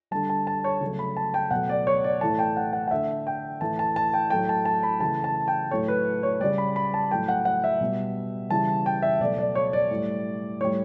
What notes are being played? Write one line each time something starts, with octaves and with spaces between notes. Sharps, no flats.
D3 G3 A5
A5
A5
C#5
C#3 F#3 A3
B5
A5
G5
B2 F#3 A3 F#5
D5
C#5
D5
A2 E3 A3 A5
G5
F#5
F#5
F#5
D3 A3 E5
G5
A2 E3 A3 A5
A5
A5
G5
A2 F#3 A3 G5
A5
A5
B5
C#3 E3 A3 A5
A5
G5
A2 F#3 A3 C#5
B4
C#5
C#3 G3 D5
B5
B5
A5
A2 F#3 A3 G5
F#5
F#5
E5
B2 G3
C#3 E3 G3 A5
G5
E5
B2 F#3 A3 D5
D5
C#5
D5
A2 G3
A2 G3 C#5